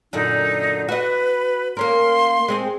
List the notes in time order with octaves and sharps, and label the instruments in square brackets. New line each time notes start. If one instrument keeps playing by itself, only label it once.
[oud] F#2 A#2 D3 [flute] D#4
[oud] F#4 D#5 [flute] B4
[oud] A#3 C#4 A#4 [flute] C6
[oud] G#3 C4 G#4